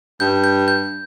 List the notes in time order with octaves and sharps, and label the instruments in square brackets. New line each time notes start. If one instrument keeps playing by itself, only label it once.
[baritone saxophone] G2 [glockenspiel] G6
[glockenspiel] G6
G6